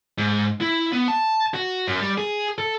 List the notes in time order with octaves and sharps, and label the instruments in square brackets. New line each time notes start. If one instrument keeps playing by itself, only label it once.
[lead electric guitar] G#2
E4
B3
A5
F#4
F#2
G3
G#4
A4